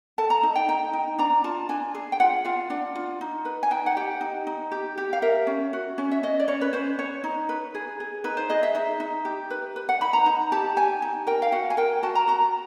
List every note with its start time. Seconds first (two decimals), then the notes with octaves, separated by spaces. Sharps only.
0.18 A4 A5
0.30 A#5
0.43 D#4
0.55 G5
0.68 D#4 G5
0.93 D#4
1.18 D4 A#5
1.44 F4 A5
1.69 D4 G#5
1.95 G#4
2.12 G5
2.20 F4 F#5
2.45 F4 F5
2.70 D4 F#5
2.95 F4
3.21 D#4
3.45 B4
3.63 G#5
3.71 D#4 G5
3.86 F#5
3.97 G4 G5
4.21 D#4
4.47 D#4
4.72 G4
4.98 G4
5.13 F5
5.22 A#4 E5
5.47 C#4
5.73 F#4
5.98 C#4
6.11 E5
6.23 C#4 D#5
6.40 D5
6.48 C#4 C#5
6.61 B4
6.73 C#4 C5
6.99 C#4 C#5
7.24 D#4
7.49 B4
7.75 G#4
8.00 G#4
8.24 D#4 B4
8.37 C5
8.49 G#4 D#5
8.63 E5
8.75 D#4 E5
9.00 D#4
9.25 G4
9.50 B4
9.76 B4
9.89 F#5
10.01 D#4 B5
10.13 A#5
10.26 D#4
10.52 G4 A5
10.77 G4 G#5
11.02 D#4
11.27 A#4 G5
11.42 F5
11.52 F#4 F#5
11.70 G#5
11.77 A#4 G5
12.03 F#4 A5
12.15 A#5
12.28 F#4 A#5